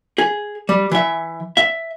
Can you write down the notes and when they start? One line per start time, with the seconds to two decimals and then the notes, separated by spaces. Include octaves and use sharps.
0.18 G#4
0.69 G3
0.91 E3 E5
1.57 E5